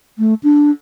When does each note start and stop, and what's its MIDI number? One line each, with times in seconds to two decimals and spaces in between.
0.19 0.34 57
0.43 0.70 62